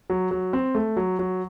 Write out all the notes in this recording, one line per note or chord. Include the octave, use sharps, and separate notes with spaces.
F#3
F#3
C4
A3
F#3
F#3